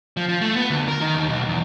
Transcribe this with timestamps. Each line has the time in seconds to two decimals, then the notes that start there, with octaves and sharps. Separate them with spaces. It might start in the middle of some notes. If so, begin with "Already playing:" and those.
0.17 F3
0.29 F3
0.41 A3
0.56 B3
0.70 D2
0.88 A#4
1.01 D#3
1.15 D#2
1.29 B1
1.49 E2